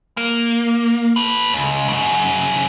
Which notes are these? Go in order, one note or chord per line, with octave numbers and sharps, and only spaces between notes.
A#3
A4 B4
C#2
F#2 C#3